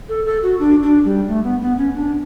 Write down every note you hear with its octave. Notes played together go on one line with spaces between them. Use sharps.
A4
A4
F#4
D4
D4
G3
A3
B3
B3
C#4
D4